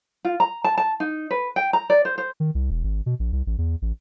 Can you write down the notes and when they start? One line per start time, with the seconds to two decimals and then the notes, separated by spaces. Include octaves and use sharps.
0.25 F4
0.40 A#5
0.64 A5
0.78 A5
1.00 D#4
1.31 B4
1.56 G5
1.73 A#5
1.90 D5
2.05 C5
2.18 C5
2.40 D#3
2.55 C2
2.70 E1
2.84 G#1
3.06 B2
3.19 A#1
3.32 C2
3.47 A1
3.58 E2
3.82 A1